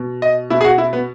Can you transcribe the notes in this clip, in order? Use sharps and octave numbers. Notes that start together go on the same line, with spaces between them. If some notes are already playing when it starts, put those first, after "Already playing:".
Already playing: B2
D#5
B2 E4
G#4
F#4
E4
B3